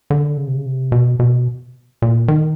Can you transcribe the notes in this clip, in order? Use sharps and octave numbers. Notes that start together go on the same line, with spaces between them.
D3
C#3
C3
C#3
C3
B2
B2
A#2
D#3